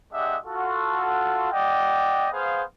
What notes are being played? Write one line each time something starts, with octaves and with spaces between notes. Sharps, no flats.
G#3 D4 G4 D#5 E5 F#5
F4 F#4 A4
D5 D#5 F#5 G5
B3 G#4 C5 F5